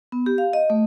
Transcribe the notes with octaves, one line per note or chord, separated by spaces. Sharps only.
B3
G4
F5
D#5
A3